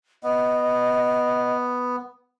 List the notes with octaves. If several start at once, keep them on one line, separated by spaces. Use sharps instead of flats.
B3 D#5